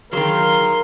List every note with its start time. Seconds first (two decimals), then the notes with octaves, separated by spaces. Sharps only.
0.13 D#3 F#3 G#4 A#4 F5 C6